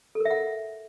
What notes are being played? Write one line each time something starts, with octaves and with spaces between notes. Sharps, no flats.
A4
A#4
E5
F#5